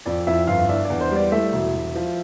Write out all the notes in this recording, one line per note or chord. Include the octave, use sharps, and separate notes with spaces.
F2 D5
F2 E4 E5
G1 F4 F5
D4 E4 E5
D5
E2
C5
G3
D5
A3 E4 E5
E1
E1
F3